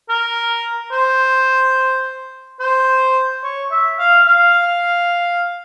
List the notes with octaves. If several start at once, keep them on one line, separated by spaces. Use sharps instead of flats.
A#4
C5
C5
C#5
E5
F5
F5